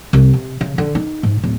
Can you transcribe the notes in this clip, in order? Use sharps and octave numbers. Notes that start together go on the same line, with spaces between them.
C2
C3
C#3
D3
D#4
G#2
D1